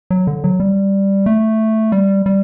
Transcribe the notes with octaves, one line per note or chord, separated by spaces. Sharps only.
F#3
D3
F#3
G3
A3
G3
G3